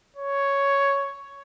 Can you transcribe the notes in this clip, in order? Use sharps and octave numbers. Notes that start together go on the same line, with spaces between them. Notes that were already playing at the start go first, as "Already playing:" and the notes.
C#5